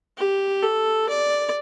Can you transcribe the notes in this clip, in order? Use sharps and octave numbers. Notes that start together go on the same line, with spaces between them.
G4
A4
D5